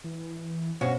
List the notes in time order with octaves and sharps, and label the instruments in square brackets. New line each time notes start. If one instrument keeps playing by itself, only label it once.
[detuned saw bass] E3
[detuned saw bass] G2 [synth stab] B2 C#4 [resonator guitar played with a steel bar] F#4 [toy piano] C5 F5 F#5